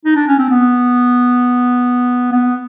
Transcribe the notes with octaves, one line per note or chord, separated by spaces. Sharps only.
D#4
D4
C#4
C4
B3
B3